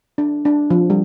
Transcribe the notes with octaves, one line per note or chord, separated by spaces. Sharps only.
D4
D4
F3
G3